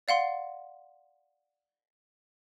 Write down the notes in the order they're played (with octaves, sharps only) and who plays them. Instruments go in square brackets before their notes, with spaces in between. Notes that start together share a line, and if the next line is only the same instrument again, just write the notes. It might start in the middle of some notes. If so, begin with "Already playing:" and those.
[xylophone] D5 F5 F#5 C6